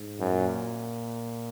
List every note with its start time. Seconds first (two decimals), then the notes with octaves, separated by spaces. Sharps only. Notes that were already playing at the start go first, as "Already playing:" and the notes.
Already playing: G#2
0.20 F#2
0.33 A#2